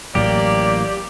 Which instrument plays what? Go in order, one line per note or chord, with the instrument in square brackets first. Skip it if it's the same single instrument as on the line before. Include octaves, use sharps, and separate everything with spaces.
[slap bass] A1 A2 F#3 [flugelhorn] A#3 [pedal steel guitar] G4 [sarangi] D5